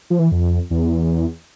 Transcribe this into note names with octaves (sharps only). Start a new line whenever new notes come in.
F3
E3
F2
E2